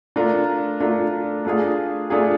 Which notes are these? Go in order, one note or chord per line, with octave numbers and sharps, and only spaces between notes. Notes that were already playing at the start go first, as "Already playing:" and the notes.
A3 D4 F4 A#4
A3 D4 F4 A#4
A3 D4 F4 G#4
A3 D4 F4 G#4